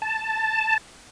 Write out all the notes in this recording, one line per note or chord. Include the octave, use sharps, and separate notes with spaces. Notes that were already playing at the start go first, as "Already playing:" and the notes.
A5